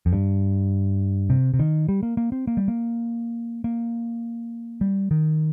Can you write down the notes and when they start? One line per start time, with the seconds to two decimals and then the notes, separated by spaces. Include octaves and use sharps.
0.06 F2
0.13 G2
1.30 C3
1.54 C3
1.59 D#3
1.89 G3
2.03 A#3
2.17 A#3
2.32 C4
2.47 A#3
2.57 G3
2.68 A#3
3.64 A#3
4.81 G3
5.11 D#3